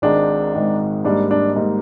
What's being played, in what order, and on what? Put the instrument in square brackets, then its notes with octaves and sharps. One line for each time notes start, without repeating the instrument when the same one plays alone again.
[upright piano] G#1 G#2 D#3 G#3 D#4 [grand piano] D4
[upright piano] G#1 G#2 D#3 G#3 D#4
[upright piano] G#2 G3 A#3 D#4 [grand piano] D4
[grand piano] D4
[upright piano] G#2 G3 A#3 D#4